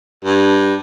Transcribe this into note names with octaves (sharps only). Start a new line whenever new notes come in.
G2